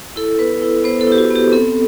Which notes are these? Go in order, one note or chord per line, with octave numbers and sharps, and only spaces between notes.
E4 A4
B3 B4
E4
B3 C5
A4
E4 G4
F#4
B3
G4
C4 A4